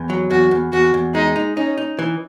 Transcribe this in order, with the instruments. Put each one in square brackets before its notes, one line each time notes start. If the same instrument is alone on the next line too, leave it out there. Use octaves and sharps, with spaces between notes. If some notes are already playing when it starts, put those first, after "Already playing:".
Already playing: [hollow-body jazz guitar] E2
F#3
[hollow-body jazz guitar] E2 [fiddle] F#4
[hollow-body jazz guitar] E2
[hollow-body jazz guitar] E2 [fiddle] F#4
[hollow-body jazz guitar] E2
[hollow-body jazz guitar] G#3 [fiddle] D#4
[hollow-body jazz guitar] D#4
[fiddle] C#4 [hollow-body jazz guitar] D#4
[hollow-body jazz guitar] D#4
E3